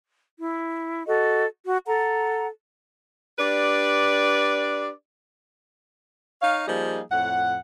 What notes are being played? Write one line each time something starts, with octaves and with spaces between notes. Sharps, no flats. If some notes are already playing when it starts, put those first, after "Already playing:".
E4
F#4 A4 D#5
F#4
A4 F#5 A#5
D4 G4 B4 D5
D#4 C#5 F5
F3 G3 A#3 D#4 G#4
F2 A2 F#5